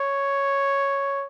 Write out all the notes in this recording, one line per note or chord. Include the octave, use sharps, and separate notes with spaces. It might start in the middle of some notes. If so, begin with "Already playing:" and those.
Already playing: C#5